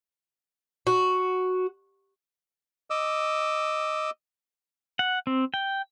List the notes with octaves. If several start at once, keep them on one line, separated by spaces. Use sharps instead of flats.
F#4
D#5 D6 E6
F#5
C4
G5